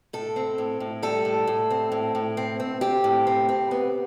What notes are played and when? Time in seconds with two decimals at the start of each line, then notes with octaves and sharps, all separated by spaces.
0.13 A2 A4
0.36 C4
0.58 A2
0.80 A2
1.03 G3 A4
1.25 A2
1.47 A2
1.70 C4
1.92 A2
2.15 A2
2.37 C4
2.60 C4
2.81 C4 G4
3.04 A2
3.27 C4
3.49 C4
3.71 B3